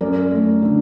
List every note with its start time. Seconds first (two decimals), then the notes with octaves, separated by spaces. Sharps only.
0.01 F#2 A#4 D5
0.31 A3
0.62 D3